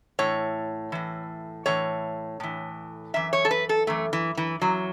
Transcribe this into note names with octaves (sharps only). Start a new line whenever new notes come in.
A2 E3 C#5
A2 E3
A2 E3 C#5
A2 E3
F#2 E3 E5
C#5
A4
B4
A4
F#2 E3 A3
E3
E3
F#2 E3 F#3